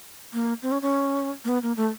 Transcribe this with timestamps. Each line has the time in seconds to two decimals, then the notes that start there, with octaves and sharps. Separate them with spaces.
0.33 A#3
0.62 C4
0.72 C#4
0.82 C#4
1.44 A#3
1.48 B3
1.63 A#3
1.77 A3